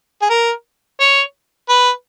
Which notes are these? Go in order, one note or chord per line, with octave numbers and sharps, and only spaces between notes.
G#4
A#4
C#5
B4